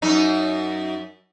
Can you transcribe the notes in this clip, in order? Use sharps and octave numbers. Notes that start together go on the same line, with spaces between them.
F#2 D#4